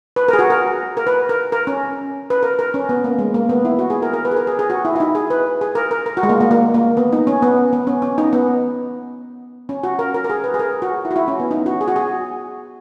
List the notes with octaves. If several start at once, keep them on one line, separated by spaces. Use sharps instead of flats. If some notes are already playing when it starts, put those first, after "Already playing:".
B4
G#4 A#4
F#4
A#4
A#4
B4
A#4
A#4
C#4
B4
A#4
A#4
C#4
B3
A#3
G#3
A#3
B3
E4
F#4
G#4
A#4
A#4
B4
G#4
A#4
G#4
G#4
F#4
E4
E4
D#4
G#4
B4
G#4
A#4
A#4
A#4
F#4
G#3
A#3
A#3
A#3
A#3
B3
D#4
C#4
B3
B3
C#4
C#4
D#4
B3
C#4
F#4
A#4
A#4
A#4
G#4
B4
G#4
A#4
F#4
E4
F#4
E4
C#4
B3
D#4
F#4
G#4
F#4
G#4